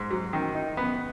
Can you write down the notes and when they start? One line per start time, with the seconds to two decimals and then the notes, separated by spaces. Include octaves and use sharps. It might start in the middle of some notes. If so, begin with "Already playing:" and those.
Already playing: G#2
0.11 F#3
0.33 D#3
0.55 D#4
0.77 B3